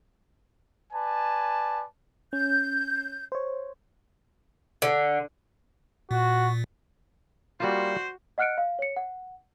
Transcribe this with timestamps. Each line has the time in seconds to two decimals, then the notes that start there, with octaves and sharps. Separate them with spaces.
0.92 B4 D5 G#5 A5
2.33 C#4 G6
3.32 C5 C#5
4.82 D3
6.11 A#2 F#4
7.60 G3 A#3 F4 F#4 C5
8.38 D#5 F#5 F6 F#6 C#7 D7
8.58 F5
8.79 C#5 C#7
8.97 F#5